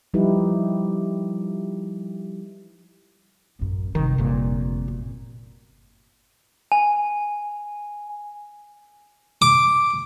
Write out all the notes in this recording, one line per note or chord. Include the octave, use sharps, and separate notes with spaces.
F3 G3 D#4 E4 G4 B4
A1 F#2
G1 F2 C3 D#3
G1 A#2
F#2
G#5
D6